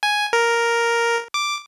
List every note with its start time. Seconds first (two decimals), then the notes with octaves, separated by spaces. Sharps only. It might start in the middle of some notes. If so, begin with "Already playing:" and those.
0.03 G#5
0.33 A#4
1.34 D6